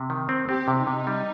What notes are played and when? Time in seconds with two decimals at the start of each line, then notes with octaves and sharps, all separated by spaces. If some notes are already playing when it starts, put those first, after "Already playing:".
Already playing: C3
0.10 D#3
0.29 C4
0.48 C4 G4
0.68 C3
0.77 D#4
0.87 C3
1.07 G3